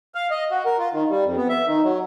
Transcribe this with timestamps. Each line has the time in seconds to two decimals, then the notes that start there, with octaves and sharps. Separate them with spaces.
0.15 F5
0.31 D#5
0.51 F#4
0.66 A#4
0.79 F4
0.93 D#3
1.09 G3
1.24 F2
1.36 B3
1.49 E5
1.66 D#3
1.84 F#3